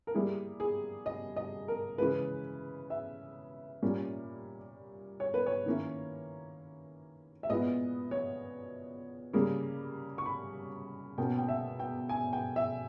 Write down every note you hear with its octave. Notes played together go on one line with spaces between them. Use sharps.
A#4
G3 A#3 E4 G#4
G#4
D#5
D#5
A#4
C#3 E3 G#3 B4
E5
A#2 G3 A#3 C#4
C#5
B4
C#5
D#3 A#3 C#4 E4
E5
A#2 G#3 B3 E4 D#5
C#5
C#3 G3 A#3
C#6
B5
B2 A#3 C#4 G5
G5
E5
G5
G#5
G5
E5